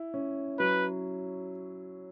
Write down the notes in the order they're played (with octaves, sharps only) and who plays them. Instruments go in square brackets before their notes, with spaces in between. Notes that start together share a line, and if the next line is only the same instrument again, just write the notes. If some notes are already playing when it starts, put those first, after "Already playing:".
Already playing: [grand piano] E4
C#4
[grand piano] F#3 [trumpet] B4